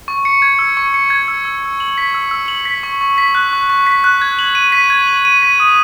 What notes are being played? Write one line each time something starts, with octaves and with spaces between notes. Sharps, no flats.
C#6
C#7
G#6
E6
C#6
C#7
G#6
E6
E6
E6
F#7
B6
E6
E6
F#7
B6
C#6
C#6
B6
F#6
C#6
C#6
B6
F#6
G#6
F#7
D#7
B6
G#6
F#7
D#7
B6
D#6